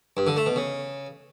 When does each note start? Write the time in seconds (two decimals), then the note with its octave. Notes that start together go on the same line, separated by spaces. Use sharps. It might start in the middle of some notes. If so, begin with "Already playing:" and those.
0.17 G2
0.27 D3
0.36 A3
0.46 B2
0.56 C#3